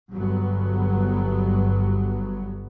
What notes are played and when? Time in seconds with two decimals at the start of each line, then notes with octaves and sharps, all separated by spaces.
0.11 G1 G2 F#3 B3